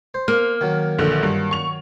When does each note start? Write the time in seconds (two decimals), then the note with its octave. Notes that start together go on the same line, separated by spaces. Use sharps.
0.14 C5
0.28 A#3 F6
0.61 D#3 F#3
0.99 A#1 D3
1.23 G2
1.51 C#6 F7